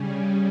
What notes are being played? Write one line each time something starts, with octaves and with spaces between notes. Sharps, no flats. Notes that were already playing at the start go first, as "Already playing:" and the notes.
Already playing: C#3 G3 C#4